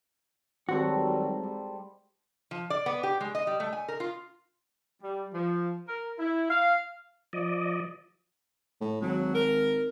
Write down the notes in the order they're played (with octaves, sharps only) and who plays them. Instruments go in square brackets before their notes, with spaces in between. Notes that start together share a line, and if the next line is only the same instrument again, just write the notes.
[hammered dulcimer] G#2 C4 A4 [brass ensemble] D#3 F#3 G3 [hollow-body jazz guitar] F#4
[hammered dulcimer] G3
[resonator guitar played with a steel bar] F3
D5
B3
G4
G#3
D#5
G3
A3
G#5
A#4
F4
[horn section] G3
F3
A#4
E4
F5
[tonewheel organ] F3 D5 D#5
[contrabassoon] A2
[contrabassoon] G#1 [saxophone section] F#3
[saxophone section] A#4